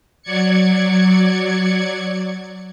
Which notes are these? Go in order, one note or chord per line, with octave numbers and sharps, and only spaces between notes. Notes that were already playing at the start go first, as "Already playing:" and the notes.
F#3 D5 G#6 C#7